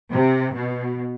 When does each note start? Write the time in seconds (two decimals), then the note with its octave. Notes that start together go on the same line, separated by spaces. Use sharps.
0.12 C3
0.54 B2